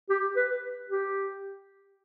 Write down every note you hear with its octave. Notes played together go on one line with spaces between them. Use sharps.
G4
B4
G4